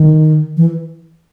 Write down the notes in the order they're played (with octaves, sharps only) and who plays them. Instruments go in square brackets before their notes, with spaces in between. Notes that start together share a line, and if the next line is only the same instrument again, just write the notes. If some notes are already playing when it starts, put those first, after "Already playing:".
Already playing: [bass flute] D#3
E3